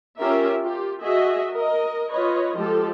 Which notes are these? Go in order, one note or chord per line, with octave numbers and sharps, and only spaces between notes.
C#4 F4 G4 A#4 E5
F4 G4
F#4 G#4 D#5 E5
A#4 D#5
F4 B4 C#5 D#5
F3 G#3 G4 A4